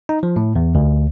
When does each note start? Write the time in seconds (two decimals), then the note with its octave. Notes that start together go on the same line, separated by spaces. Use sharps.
0.09 D#4
0.23 F3
0.36 A2
0.56 E2
0.75 D2